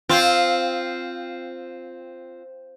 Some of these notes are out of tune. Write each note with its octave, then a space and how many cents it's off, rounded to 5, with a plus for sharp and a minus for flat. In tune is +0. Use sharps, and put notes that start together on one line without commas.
C4 +0 F4 +0